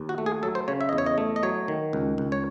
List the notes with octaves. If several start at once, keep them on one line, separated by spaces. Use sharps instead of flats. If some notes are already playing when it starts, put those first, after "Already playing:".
Already playing: D#2
F#4
A3
G#4
F#3 A4
C5
C#3 C#5
E5
D#5
E2
C#5
D#5
A3
D#5
F#3 C#5
D#3
C#2
C#2
C#5